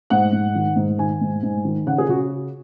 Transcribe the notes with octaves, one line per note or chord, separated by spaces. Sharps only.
G#2 F#5
G#2
D#3
G#2
D#3 G#5
G#2
G#2
D#3
C#3 F#5
G#4
C#3 F#4